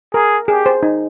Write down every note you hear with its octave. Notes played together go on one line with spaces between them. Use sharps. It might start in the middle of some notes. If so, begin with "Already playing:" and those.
G#4 A#4
G4 G#4
C5
D#4